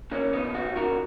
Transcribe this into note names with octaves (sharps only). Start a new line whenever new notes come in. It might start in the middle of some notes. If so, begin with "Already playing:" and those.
C#3 A#3 C#4
D#2 B3 D#4
D#2 D#4 F#4
C#3 F#4 A#4